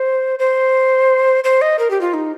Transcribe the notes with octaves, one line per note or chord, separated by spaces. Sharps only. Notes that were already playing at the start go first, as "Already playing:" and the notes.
Already playing: C5
C5
C5
D#5
A#4
G4
F4
D#4